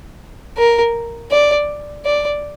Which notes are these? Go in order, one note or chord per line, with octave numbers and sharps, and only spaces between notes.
A#4
D5
D5